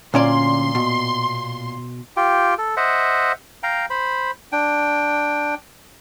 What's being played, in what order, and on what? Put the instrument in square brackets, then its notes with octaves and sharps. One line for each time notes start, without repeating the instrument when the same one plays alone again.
[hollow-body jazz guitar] D2 C#4 D5 [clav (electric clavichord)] A#2 [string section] C6
[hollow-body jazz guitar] B2
[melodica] F4 G4 G5
A4
C5 D#5 E5 F#5
F5 G5 A#5
C5 B5
D4 G5